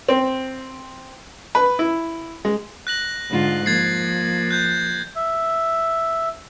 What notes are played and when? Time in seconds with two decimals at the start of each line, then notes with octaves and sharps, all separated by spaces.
0.09 C4
1.55 B4
1.79 E4
2.45 G#3
2.87 F#6 A#6 F#7
3.30 G#2 D3 F4
3.66 F3 A#3 G#6 A6 C7
4.51 F#6 G6 A6
5.16 E5